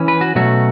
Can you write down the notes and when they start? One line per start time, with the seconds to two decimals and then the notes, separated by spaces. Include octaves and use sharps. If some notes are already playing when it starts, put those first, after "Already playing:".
Already playing: E3 C#4
0.08 B4
0.21 F#4
0.35 B2 F#3 A3 C#4 F#4